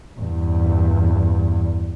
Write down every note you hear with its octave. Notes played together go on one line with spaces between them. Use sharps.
E2 G2